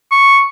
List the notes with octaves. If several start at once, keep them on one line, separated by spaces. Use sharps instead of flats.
C#6